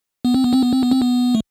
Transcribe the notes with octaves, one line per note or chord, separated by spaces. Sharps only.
B3
C4
B3
C4
B3
C4
B3
C4
B3
A3